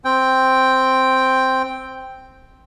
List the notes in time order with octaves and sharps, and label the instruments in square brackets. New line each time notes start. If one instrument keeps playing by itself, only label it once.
[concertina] C4 G5